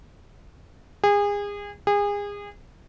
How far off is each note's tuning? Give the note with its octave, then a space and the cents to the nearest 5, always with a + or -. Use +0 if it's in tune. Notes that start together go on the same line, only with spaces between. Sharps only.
G#4 -30
G#4 -30